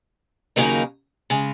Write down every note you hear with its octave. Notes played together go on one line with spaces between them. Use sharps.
D#2 C#3 F#3 A#3 D#4
C#3 G#3